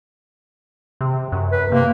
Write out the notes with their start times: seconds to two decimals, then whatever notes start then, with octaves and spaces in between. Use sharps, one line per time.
1.01 C3
1.32 F#2
1.52 B4
1.72 C3 A#3